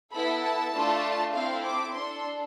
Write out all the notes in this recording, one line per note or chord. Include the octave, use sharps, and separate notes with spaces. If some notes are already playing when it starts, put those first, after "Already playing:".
B3 E4 A4 B5
A5
A3 D4 F4 A4
C4 E4 A4 F5
D6
D4 A4 C6